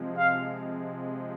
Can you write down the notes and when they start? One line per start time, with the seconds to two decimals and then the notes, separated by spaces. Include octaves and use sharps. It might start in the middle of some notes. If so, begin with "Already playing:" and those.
Already playing: C3 F3 G#3
0.18 F5